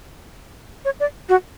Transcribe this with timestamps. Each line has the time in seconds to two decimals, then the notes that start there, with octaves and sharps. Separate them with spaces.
0.85 C#5
1.00 D5
1.29 F#4